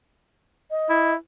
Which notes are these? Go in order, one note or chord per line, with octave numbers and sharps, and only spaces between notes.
D#5
E4